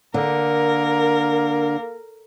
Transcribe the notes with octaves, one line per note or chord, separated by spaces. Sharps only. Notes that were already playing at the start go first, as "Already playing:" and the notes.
D3 A#3 A#4